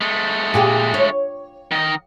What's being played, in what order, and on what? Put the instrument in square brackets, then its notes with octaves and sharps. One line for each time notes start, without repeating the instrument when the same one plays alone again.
[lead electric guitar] G#3 A3
[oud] A#2 G4 G#4
C#5
[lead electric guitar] D#3 D#5